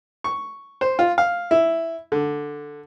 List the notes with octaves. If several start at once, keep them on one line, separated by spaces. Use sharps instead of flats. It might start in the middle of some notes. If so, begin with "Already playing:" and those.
C#6
C5
F4
F5
E4
D3